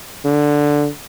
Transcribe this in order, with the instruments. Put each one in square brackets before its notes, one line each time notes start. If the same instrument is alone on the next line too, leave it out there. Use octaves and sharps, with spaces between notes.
[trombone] D3